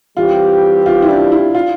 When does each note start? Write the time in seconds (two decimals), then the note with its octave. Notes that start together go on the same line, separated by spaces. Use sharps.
0.16 E3 G3 C4 F4 G4
0.86 F4
1.02 E4
1.09 D4
1.32 E4
1.55 F4